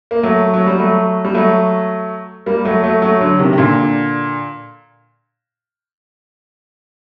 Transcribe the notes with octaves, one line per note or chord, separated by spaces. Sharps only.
A#3
F#3 A3
F#3
G3
F#3 A3
G3
F#3 A3
G3 A#3
F#3 A3
F#3 A3
F#3 A3
D3 F#3
C3 D#3
C3
A#2 D3